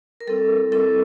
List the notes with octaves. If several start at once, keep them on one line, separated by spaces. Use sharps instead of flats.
A#4
G3 C4 E4 A4
G3 C4 E4 A4